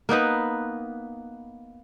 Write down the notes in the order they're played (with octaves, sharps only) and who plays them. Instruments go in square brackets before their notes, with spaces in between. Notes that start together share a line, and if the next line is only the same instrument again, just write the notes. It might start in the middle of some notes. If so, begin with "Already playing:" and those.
[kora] A#3 B3 D#4 B4